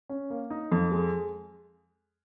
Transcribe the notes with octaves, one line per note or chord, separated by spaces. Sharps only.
C#4
A#3
D#4
F2
G#3